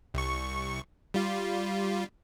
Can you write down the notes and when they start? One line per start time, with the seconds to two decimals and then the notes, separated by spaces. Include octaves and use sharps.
0.14 C2 C#6
1.14 G3 F4